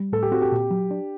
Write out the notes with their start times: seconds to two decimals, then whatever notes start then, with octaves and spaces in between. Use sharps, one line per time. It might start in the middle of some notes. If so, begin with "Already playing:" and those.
Already playing: G3
0.12 A2 A4
0.23 G4
0.31 C4 F#4
0.42 G4
0.52 A#2
0.71 F#3
0.91 D4